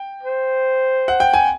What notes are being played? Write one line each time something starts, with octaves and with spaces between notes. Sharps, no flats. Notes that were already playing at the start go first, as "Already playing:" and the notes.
Already playing: G5
C5
F#5
G5
G#5